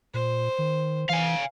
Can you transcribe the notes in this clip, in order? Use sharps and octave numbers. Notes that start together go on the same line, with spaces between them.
A#2 C5
D#3
E3 F5 G#5